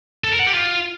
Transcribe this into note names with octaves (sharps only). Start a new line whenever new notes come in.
A4
A#4
F#5
G4
F4